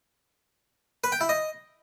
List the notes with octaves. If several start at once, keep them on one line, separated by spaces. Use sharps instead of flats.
B4
G5
E4
D#5